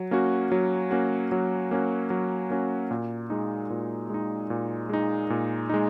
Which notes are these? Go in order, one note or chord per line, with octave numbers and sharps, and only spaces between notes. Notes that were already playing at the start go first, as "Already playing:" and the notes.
Already playing: F#3
A#3 C#4 F#4
F#3
A#3 C#4 F#4
F#3
A#3 C#4 F#4
F#3
A#3 C#4 F#4
A#2
G#3 D#4
A#2
G#3 D#4
A#2
G#3 D#4
A#2
G#3 D#4